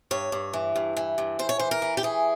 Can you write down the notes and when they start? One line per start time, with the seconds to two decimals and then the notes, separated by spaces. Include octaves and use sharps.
0.11 G2 C#5
0.32 G2
0.53 E3
0.76 G2
0.97 E3
1.18 G2
1.39 E2 C5
1.49 C#5
1.59 E3 C5
1.71 A#4
1.82 E3
1.97 G4
2.03 E3 G#4